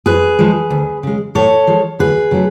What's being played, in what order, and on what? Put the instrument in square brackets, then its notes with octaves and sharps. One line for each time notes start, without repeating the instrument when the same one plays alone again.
[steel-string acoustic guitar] F2 G#4 B4
F3 G#3
D2
C#3 G#3
A2 A4 C#5
F3 G#3
D2 G#4 B4
C#3 F#3 A3